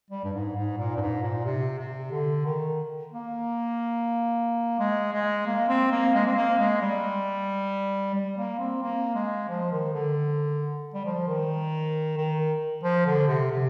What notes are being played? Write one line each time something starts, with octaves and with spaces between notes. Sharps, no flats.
G3
G2
G#2
G#2
A#2
G2
G#2
A#2
C3
C3
D3
D#3
A#3
G#3
G#3
A#3
C4
A#3
G#3
C4
A#3
G#3
G3
G3
A#3
C4
A#3
G#3
F3
D#3
D3
G3
F3
D#3
D#3
F3
D3
C3
C3